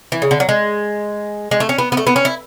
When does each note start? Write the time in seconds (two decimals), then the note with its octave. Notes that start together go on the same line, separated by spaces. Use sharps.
0.12 E3
0.22 C#3
0.31 D3
0.40 F#3
0.49 G#3
1.51 G#3
1.60 A3
1.69 C#4
1.78 B3
1.92 B3
1.97 A3
2.07 B3
2.16 C#4
2.25 E4